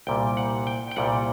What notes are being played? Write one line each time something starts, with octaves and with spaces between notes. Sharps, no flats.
C2 A#2 G3 G5
F#5
G5
G5
C2 A#2 G3 F#5